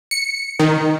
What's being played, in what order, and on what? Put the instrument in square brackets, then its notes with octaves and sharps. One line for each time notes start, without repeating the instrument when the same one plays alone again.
[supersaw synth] C#7
D#3